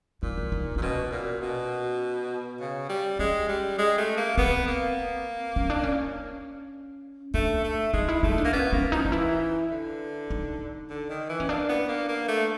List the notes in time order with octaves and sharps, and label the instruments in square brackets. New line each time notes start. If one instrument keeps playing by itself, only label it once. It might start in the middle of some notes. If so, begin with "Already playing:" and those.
[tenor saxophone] A#2 [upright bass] D#4
[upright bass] D#4
D#4
[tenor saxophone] A#2 [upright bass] D4
[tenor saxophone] B2 [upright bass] C#4
[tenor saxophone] A#2
B2
C#3
G3
[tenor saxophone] G#3 [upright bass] C#4
[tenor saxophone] G3
G#3
A3
A#3
[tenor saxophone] B3 [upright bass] C4
[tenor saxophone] A#3
[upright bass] C#4
D4
C#4
[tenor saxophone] A3 [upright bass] D4
[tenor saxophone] A3
[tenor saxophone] G#3 [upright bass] D#4
[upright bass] E4
[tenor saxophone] A3 [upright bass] D#4
[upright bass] D4
[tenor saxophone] A#3
[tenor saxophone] B3 [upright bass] C#4
[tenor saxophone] A#3 [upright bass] C#4
[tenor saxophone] F3 [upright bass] D#4
[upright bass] D#4
[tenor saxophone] E3 [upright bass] E4
[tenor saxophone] D3
[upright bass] D#4
[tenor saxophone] D3
D#3
E3
[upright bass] C#4
[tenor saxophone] A#3 [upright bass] D4
[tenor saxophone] B3
A#3
A#3
A3